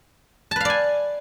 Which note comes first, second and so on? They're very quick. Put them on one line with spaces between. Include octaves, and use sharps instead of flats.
A5 B4 F5 D5 G#5